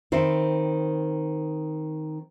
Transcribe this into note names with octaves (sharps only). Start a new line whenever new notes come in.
D#3 C4 E4